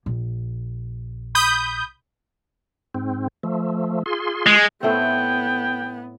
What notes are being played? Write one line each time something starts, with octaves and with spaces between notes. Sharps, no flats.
A#1
B5 D#6 G6
G#2 C4
F3 A3
F4 G#4 C6
G#3
A2 A3 B3 C4 G5